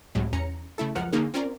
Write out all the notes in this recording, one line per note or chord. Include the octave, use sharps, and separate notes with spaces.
C#2 A2 C3 F#3 G#3
E2 C#4 A#5 C#7
C#3 A3 E4 A4
C#2 F#2 F3 A#4 F#5 F6
D3 A#3 C#4 D#4 G#4 A#4
C4 C#4 F4 A#4 D5